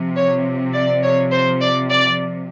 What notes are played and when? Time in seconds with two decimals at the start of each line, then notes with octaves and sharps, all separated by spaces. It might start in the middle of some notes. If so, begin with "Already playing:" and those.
Already playing: C3 F3
0.16 C#5
0.73 D5
1.03 C#5
1.32 C5
1.60 D5
1.90 D5